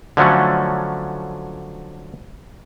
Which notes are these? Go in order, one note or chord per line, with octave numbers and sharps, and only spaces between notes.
D3 F3 F#3 A3 C#4